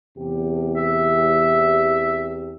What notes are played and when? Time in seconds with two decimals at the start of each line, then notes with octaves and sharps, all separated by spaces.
0.17 E2 C3 G4
0.77 E5